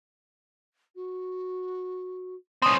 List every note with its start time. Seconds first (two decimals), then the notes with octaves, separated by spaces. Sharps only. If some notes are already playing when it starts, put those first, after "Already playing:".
0.95 F#4
2.62 C4 C#4 D#6